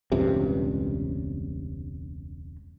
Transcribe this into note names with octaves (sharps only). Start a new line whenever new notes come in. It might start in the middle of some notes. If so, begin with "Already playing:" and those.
E1 C#2 G2 C3